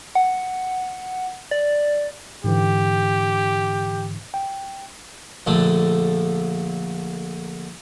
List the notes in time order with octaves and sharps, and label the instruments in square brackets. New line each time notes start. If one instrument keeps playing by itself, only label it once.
[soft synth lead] F#5
D5
[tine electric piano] G#2 D3 E3 [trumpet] G4
[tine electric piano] G5
[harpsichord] A#1 D3 A3